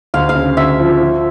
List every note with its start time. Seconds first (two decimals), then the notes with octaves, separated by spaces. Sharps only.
0.14 D2 F5
0.29 F5
0.35 C#3
0.57 D2 E5
0.79 F3
1.01 F3